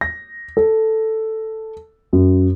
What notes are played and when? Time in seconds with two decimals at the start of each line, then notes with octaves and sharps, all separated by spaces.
0.01 A#6
0.57 A4
2.13 F#2